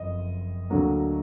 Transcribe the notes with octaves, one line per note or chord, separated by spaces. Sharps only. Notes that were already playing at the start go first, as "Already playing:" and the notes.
Already playing: F#1 F2 F3 D#5
D2 D3 F#3 A#3